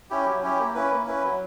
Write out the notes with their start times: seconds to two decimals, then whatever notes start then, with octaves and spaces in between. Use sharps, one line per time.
0.10 C#4 E4 G4
0.26 F#3
0.42 C#4 E4 G4
0.59 A#3
0.75 C#4 E4 B4
0.91 A#3
1.07 C#4 E4 B4
1.23 F#3